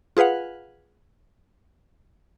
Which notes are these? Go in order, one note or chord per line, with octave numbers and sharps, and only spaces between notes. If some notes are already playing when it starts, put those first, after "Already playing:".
F4 G#4 B4 F5 F#5